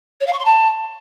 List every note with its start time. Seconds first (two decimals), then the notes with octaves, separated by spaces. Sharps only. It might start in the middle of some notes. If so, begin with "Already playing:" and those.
0.20 C#5
0.26 F5
0.33 C#6
0.39 C6
0.45 A5